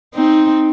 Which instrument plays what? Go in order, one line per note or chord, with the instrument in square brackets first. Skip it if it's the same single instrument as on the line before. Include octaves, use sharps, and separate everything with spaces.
[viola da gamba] C4 D#4